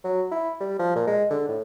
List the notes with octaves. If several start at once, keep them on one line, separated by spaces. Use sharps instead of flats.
F#3
E4
G3
F3
A#2
G#3
D3
A2